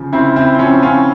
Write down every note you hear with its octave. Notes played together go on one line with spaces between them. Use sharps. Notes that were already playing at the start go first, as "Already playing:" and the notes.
Already playing: C#3 F3
C#3 C4 E4
C4 E4
C4
F3 C#4
C#4 F4